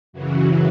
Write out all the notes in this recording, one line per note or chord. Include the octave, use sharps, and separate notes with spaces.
F#2 C#3 E3 F#3